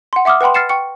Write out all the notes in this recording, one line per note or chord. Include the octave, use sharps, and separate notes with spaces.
F#5 C6
E5 F#5 D6 D#6 F6
B4 F#5 G5 B5 C6
F6 A6 C7 C#7 E7
G5 C#6 C#7